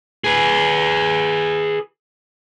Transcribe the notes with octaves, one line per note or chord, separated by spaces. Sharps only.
G#4 B4